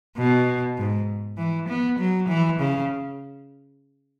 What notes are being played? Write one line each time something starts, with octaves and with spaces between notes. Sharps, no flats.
B2
G#2
E3
B3
F#3
E3
C#3